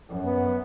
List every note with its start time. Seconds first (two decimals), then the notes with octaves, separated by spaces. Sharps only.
0.09 F#2
0.25 B3